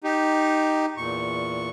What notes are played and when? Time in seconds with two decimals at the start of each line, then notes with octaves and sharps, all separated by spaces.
0.04 D#4 G4
0.97 E2 A#2 C#6